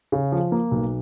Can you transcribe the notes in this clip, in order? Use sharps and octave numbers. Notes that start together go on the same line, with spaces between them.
C#3
F3
A#3
B1